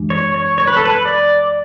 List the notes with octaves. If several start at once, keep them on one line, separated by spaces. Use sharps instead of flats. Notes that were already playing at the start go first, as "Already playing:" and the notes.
Already playing: F#2 E3 G#3 D4
C#5
C#5
C#5
B4
A4
B4
D5